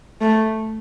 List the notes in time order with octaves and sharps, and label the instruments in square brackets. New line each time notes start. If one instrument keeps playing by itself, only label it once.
[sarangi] A3